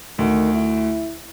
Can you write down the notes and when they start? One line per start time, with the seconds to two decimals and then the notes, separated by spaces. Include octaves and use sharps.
0.19 D2 D#3
0.54 E4